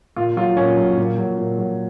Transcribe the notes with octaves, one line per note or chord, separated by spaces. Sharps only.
A#2 F4
F#3 F4
A#2 C#4
F#3
A#2
F#3
A#2
F#3